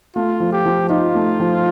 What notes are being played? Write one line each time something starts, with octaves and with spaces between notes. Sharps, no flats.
A3 F4
F3
G4
F3
D#4 F4
A3
F3